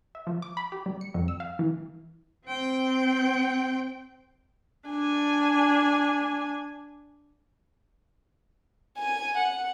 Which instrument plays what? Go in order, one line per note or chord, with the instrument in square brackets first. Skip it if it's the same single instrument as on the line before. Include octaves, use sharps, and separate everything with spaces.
[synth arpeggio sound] E5
F3
D6
B5
G4
G3
C#7
F2
E6
F5
E3
[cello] C4 G5
[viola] D4 G#5
[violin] G#5
F#5